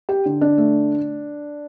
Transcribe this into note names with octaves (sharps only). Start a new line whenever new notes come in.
G4
D3
D4
A3